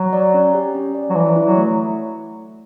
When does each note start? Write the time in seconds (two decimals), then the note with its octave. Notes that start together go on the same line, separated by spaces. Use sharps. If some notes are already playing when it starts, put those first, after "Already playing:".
Already playing: F#3
0.13 D5
0.34 C#4
0.55 G4
0.75 C#4
0.95 D5
1.10 F#3
1.15 E3 D5
1.36 E4
1.43 F#3
1.57 A3